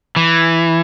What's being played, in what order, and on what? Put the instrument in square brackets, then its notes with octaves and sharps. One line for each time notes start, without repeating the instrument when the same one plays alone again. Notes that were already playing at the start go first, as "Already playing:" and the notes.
[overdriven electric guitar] E3